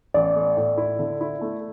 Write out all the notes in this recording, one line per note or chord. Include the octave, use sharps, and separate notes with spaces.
A1 D5
A3
A2
E4
D3
E4
A3